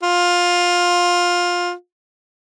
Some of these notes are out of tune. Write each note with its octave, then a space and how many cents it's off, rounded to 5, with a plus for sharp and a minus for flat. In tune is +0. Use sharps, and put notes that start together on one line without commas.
F4 +15